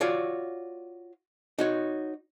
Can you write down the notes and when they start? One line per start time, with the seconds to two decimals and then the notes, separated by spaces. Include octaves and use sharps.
0.01 F4 F#4 C#5 D5
1.58 D#4 F#4 C#5